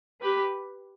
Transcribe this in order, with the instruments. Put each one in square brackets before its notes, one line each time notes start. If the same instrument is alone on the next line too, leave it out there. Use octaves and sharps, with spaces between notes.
[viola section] G4 B4